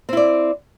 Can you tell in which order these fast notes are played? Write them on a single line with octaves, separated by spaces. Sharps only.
C4 E4 D5